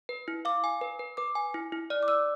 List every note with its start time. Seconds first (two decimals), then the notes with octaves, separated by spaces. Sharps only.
0.09 B4
0.28 E4
0.45 F5 D6
0.64 G#5
0.81 B4
0.99 B4
1.17 B4 D6
1.35 G#5
1.54 E4
1.72 E4
1.90 D5 F6
2.03 D6
2.08 D5 E6